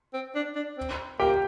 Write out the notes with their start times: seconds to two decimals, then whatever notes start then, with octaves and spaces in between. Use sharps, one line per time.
0.13 C4
0.35 D4
0.56 D4
0.78 C4
1.19 A#3 G4 G5